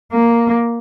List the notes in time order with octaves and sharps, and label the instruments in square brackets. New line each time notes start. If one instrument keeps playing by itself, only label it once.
[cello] A#3